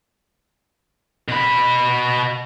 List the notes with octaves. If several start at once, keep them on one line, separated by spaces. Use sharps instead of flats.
B2 B5